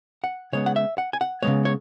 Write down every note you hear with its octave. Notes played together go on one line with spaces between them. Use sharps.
F#5
C#3 G#3 B3 C#5
F#5
E5
F#5
G#5
F#5
C#3 G#3 B3 C#5
C#5